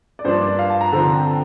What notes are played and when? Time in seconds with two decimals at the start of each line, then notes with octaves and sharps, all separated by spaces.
0.19 D5
0.24 G2 F3 A#3 D4 C5
0.41 D5
0.59 F5
0.70 A5
0.81 A#5
0.92 D3 F3 C4 A#5
1.04 A5
1.16 G5
1.26 A5